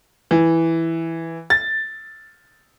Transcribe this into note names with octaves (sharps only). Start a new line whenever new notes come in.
E3
A6